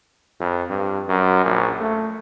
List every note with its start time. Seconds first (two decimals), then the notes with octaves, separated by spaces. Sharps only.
0.40 F2
0.69 G2
1.09 F#2
1.46 A#1
1.81 A3